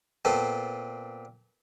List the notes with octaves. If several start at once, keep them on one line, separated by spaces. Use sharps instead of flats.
A#2 B3 C4 A4